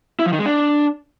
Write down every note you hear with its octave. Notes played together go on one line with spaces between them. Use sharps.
E4
F3
D#3
G#3
D4